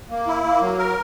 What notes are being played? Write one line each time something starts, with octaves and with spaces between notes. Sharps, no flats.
A#3
E4
A#3
F#3
A#4